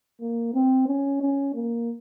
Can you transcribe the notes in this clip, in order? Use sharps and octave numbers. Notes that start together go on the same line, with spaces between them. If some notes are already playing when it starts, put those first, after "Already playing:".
A#3
C4
C#4
C#4
A#3